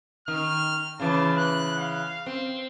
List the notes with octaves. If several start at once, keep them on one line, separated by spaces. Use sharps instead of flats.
D#3 F6
C#3 E3 A5
F#6
F5
C4